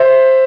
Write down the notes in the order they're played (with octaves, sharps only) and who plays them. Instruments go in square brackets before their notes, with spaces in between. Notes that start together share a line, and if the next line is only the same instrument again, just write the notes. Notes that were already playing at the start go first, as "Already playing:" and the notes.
Already playing: [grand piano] C5 E5